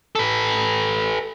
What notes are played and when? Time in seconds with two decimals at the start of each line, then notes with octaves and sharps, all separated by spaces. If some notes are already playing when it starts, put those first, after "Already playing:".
0.15 A4 B4